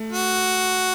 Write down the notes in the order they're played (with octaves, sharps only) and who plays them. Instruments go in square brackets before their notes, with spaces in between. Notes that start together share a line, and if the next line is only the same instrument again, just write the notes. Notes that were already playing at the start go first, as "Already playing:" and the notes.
Already playing: [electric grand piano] A3
[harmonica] F#4